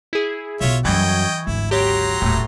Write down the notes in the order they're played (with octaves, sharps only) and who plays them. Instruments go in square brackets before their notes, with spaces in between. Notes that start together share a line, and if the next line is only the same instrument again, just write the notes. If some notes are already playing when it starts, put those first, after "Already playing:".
[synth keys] E4 G#4
[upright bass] B1 B2 [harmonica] F4 C#5 E5
[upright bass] F#2 G3 [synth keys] E3 C#6 G#6 [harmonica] D#5 G5
[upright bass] G#1 D2 [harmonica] E4
[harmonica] F#3 A#5 C6 [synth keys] G4 C#5
[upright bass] D#1 [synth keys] A2 A3